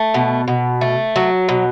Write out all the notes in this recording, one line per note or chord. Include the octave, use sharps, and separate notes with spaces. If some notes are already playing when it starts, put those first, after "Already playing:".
Already playing: A3
B2
B2
A3
F#3
B2